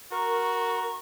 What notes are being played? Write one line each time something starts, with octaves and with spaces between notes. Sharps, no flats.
F#4 A#4 A#5 C#6